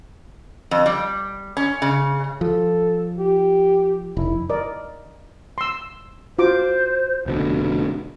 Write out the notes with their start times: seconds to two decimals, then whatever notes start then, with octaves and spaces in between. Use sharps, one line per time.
0.71 F2
0.86 G3
1.57 C#4
1.82 C#3
2.41 F3 A4
3.18 G4
4.17 F1 E4
4.49 A#4 D5 D#5
5.58 C6 E6
6.39 F4 F#4 C5 D6
7.26 F1 B2 D3